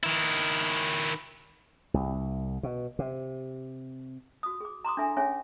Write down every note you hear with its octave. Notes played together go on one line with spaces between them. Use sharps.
D#3 E4
C2
B2
C3
F#4 D#6
G#4 D6
A#5 C6 D6 D#6
D4 E4 A4 E5 G#5
C#4 G#4 C#5 E5 G#5